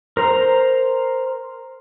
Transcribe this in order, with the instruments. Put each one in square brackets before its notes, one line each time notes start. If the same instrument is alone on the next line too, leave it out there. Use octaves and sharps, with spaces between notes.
[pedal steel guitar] A#4 C5 A#5